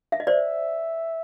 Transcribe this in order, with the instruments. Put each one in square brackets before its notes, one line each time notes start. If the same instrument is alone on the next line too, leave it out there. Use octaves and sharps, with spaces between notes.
[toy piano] E5
D#5
[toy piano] C5 D5 [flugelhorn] E5